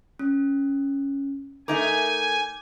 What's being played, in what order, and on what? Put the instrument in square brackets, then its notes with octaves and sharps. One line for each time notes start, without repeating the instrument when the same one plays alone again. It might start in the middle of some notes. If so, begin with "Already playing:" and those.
[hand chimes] C#4
[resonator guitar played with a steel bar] A3 D#4 A#4 [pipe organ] G#5 [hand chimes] D6 G6 G#6